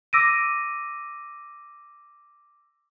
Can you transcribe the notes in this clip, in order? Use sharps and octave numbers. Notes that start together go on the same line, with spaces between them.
D6 E6 A#6 D7 D#7